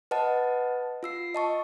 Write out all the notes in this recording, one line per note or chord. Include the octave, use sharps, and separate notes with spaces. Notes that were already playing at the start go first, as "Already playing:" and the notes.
B4 D#5 F#5 A5
F4 E6 C7
D#5 A5 C#6